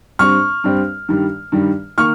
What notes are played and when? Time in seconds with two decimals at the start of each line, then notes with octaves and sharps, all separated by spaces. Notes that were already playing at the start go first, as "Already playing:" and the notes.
0.19 G2 G3 C4 C#6 F6
0.64 G2 G3 C4
1.09 G2 D#3 G3
1.52 G2 D#3 G3
1.98 D#3 A#3 C#6 F6